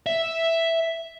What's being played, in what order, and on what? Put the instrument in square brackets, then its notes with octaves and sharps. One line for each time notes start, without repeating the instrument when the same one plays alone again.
[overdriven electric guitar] E5